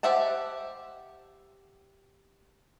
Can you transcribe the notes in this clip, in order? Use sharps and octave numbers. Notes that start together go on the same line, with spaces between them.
G4 C5 E5 F#5 A5